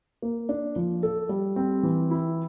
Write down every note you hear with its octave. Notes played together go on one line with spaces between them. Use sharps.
A#3
D4
F3
A4
G3
C4
E3
E4